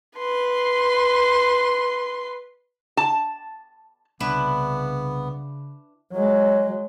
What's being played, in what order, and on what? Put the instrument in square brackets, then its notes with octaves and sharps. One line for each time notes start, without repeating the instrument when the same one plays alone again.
[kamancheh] B4 C6
[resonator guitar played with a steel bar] A5
[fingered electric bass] C2 [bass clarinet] C#3 [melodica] B3 [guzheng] D4 E4 B4
[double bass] F#3 G#3